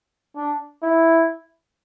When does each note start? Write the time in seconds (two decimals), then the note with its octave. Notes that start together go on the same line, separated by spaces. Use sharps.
0.36 D4
0.83 E4